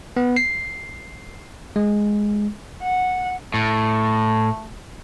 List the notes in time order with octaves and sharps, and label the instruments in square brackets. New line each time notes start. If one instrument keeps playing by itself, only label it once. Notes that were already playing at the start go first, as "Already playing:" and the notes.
[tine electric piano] B3
C7
G#3
[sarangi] F#5
[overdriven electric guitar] A2 [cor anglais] A3